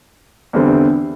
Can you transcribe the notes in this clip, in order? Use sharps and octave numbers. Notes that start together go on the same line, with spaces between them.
E2 D3 G3 C4